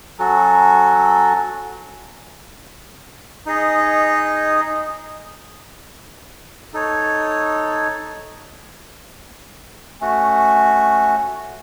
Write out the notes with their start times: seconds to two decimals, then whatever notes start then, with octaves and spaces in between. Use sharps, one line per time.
0.18 F#3 C#4 F#4 A4
3.46 D#4 G#4 D#5
6.74 D#4 A4 C#5
10.01 A3 C#4 F#4